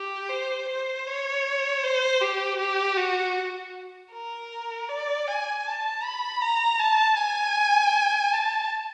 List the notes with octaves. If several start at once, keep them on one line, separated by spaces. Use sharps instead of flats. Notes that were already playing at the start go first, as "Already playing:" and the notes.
Already playing: G4
C5
C5
C#5
C5
G4
G4
F#4
A#4
D5
G#5
A5
B5
A#5
A5
G#5
A5